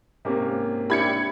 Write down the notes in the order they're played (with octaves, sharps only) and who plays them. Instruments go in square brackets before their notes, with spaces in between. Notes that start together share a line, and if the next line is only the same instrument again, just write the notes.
[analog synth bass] G#2 [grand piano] C3 A#3 C#4
[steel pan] D4 E4 G4 [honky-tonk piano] B5 G#6 C#7